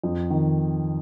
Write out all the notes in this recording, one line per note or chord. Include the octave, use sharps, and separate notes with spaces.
F2
D#3